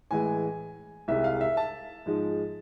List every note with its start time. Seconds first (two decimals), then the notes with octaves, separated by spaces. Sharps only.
0.11 A2 E3 G#3 G#5
1.08 C2 C3 G#3 E5
1.24 F5
1.41 E5
1.57 A5
2.06 G#2 F3 G#3